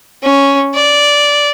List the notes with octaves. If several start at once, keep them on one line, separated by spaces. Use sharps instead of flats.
C#4
D5